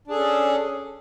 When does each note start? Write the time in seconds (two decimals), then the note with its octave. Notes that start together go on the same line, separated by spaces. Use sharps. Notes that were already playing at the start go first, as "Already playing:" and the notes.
0.07 D4
0.11 G#4
0.14 A4
0.17 C#4